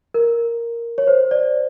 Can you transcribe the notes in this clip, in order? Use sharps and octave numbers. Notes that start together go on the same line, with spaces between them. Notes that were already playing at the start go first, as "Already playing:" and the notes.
A#4
C#5
C5
D5